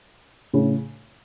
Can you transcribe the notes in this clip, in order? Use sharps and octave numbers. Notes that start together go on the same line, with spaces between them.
A2 C#3